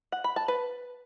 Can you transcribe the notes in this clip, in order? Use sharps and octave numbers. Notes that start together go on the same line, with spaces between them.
F#5
B5
A5
B4